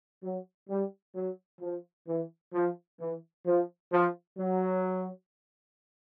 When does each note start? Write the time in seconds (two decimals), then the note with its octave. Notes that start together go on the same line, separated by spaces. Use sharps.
0.23 F#3
0.69 G3
1.15 F#3
1.61 F3
2.07 E3
2.54 F3
3.00 E3
3.46 F3
3.92 F3
4.38 F#3